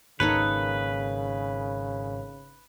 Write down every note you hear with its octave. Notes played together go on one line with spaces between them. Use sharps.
G#1 C#3 A#3 D#4 A4 B4 C#5